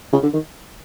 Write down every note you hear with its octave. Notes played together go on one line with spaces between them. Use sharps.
C#3
D3
D#3